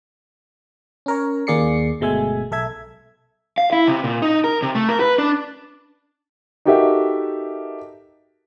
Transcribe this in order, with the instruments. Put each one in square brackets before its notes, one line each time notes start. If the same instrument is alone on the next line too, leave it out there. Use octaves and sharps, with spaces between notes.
[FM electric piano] C#4 A#4 C#5
D#2 A#3 G#4 D5 C7 C#7
G1 B2 G#3 A3 E5 G#5
B1 A4 E5 G#6
[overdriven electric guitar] F5
E4
C3
A#2
D#4
A#4
C3
A3
A#4
B4
D4
[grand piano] D#4 F#4 G4 A4 A#4 E5